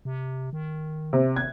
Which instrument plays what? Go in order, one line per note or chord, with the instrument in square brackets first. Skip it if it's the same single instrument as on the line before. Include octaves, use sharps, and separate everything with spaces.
[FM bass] C3
D#3
[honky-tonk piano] C3
[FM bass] G#1 [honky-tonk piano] G#6